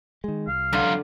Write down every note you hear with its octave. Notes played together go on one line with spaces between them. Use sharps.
D#3 G#3
C2 F5
F#2 D3 F4